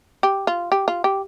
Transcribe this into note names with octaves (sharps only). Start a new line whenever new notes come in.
G4
F4
G4
F4
G4